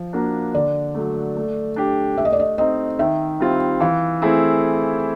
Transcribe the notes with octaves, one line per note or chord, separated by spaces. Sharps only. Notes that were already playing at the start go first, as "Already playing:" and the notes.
Already playing: F3
A#3 D4 F#4
D3 D5
F#3 A3
A3
D4 G4
A3 E5
D#5
D5
D#5
C4 D#4 D#5
D#3 E5
G3 C4 F4
E3 F5
A3 C4 E4 G#4